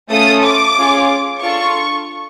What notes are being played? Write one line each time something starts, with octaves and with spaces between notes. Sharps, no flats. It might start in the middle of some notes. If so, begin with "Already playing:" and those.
A3 C#4 F4 A4 D#6
D6
C#4 F4 G#4
D4 F4 A4 C#6